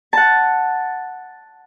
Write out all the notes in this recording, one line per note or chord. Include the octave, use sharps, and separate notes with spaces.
F#5 A5